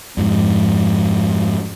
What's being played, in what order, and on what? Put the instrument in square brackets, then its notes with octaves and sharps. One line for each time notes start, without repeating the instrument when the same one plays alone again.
[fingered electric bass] F2 G#2 F3